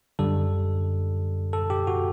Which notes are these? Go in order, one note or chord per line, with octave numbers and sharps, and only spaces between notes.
F#2 D3 G3 A4
A4
G4
F#4